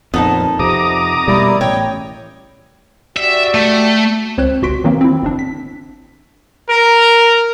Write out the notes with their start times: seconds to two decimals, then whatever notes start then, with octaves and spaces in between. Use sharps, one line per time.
0.14 F2 A#2 B3 D#4 A5
0.59 F2 C3 A#5 D6 D#6
1.28 B2 G3 A#3 E4 D5
1.61 A1 C#5 G5
3.17 F#4 G4 D5 E5
3.55 A3
4.38 C#2 C4 C5 C#5 F#6 E7
4.62 G1 C#2 F#4 C6 B6 D7
4.84 D#3 E3 F#3 A#3 C4
5.01 C4 E4
5.23 G1 C4 D4
5.39 B6
6.69 A#4